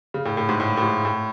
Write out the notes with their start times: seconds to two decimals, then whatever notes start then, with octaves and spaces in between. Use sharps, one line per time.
0.14 C#3
0.25 A2
0.37 A2
0.49 G#2
0.60 A2
0.77 A2
0.83 G#2
1.05 A2